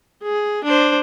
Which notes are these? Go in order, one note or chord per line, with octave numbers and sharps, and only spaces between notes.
G#4
D4 C5